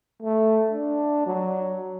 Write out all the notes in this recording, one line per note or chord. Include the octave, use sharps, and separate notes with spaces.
A3
D4
F#3